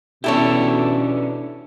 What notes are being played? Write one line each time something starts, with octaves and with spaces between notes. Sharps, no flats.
B2 C#4 D4 E4 G4 A4 C#5